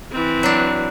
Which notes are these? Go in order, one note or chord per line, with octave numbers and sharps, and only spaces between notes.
E3 C4
F#3 D4